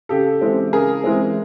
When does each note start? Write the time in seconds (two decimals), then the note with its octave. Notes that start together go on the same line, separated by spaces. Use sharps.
0.09 C#3 G4 A4
0.41 E3 G#3 C4
0.73 C#3 G#4 A#4
1.04 E3 G#3 C4